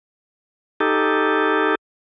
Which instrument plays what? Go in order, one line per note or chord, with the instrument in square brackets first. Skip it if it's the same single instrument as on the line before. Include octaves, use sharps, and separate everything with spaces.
[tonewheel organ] D#4 G4 A4